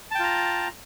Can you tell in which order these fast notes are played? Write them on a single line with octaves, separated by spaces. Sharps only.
A5 G5 F4 A#5